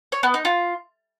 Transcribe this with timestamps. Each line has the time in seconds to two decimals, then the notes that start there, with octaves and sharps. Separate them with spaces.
0.12 C#5
0.23 B3
0.34 D#4
0.45 F4